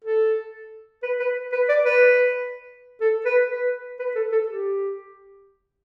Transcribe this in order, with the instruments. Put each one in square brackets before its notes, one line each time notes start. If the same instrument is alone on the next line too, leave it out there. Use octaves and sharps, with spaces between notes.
[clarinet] A4
B4
B4
B4
D5
B4
A4
B4
B4
B4
A4
A4
G4